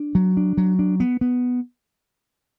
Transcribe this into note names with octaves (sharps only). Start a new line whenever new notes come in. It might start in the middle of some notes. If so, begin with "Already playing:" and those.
Already playing: D4
F#3
D4
F#3
D4
B3
B3